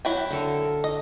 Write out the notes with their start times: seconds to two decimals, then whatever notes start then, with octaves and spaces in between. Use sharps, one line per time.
0.05 F#3 E4 G5
0.30 D3 A4 A#4
0.84 D#5